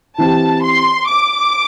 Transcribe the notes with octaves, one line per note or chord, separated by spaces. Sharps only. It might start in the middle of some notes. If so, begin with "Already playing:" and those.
E3 C4 G4 A5
C6
D6